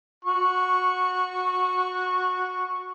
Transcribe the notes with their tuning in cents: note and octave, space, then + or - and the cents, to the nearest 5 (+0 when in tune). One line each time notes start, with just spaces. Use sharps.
F#4 -15 C#6 +0